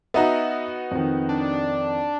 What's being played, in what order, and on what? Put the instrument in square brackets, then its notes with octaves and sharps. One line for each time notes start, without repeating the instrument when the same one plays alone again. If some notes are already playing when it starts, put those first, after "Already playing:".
[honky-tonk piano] B3 D#4 F#4 [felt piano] E5 A#5
[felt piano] F2 D#3
[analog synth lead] D4